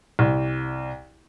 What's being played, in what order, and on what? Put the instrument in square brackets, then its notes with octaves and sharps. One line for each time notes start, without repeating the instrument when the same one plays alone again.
[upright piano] C2